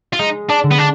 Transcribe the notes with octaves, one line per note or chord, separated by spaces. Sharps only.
F4
G#3 D#4
D4
D3
B3
D4